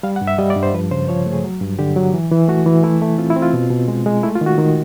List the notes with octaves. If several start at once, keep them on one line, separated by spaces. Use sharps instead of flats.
G3 F5
F#5
G2
E5
G3 D#5
D5
G2
C5
F3 B4
C#3 C5
F3 C#5
A3
G#4
F#3
G2
D3 G4
F#3
E3
E3
A3 F#4
E3
A3 E4
A3
C4 F4
E4
C4
F4
B2
B2
G#3
G#3
A3 E4
F4
D#3 F#4
D#3